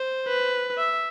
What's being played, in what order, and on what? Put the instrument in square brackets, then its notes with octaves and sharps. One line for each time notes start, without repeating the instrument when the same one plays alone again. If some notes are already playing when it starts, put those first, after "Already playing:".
Already playing: [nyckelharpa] C5
[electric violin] B4
[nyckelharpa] E5